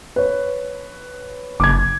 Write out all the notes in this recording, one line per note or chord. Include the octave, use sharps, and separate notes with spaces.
B4 C#5
F#1 D6 G#6